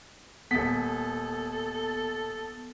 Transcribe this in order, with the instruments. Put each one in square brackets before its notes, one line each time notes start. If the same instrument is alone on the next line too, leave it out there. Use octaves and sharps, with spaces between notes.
[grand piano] D#1 B6 [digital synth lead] B3 [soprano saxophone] A4